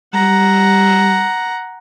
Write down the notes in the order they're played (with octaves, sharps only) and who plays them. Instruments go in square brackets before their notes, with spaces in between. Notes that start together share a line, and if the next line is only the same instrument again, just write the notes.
[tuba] G3 [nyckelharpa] F#5 A#5